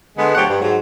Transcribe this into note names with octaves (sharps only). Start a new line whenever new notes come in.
D3 G#3 B3
D2 B2 F3 G4 C#5 F#5
G2
G#2 F#3